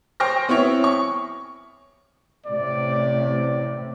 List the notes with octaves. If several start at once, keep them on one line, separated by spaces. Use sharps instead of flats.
C5 G5 C#6 F6 A#6
B3 C4 E4 C#5
C#6
A1 A2 C3 D5